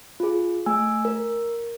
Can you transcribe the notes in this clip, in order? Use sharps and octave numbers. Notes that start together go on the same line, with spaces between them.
F4 G#4
A3 G#5 E6
A#4